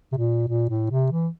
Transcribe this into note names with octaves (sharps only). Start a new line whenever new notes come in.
C3
A#2
A#2
A2
C3
E3